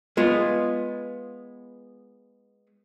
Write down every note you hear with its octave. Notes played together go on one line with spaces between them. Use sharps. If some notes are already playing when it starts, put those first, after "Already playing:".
G#3 B3 F4